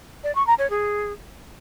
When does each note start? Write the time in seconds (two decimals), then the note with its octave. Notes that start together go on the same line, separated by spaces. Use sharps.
0.24 D5
0.35 C#6
0.47 A#5
0.59 C#5
0.70 G#4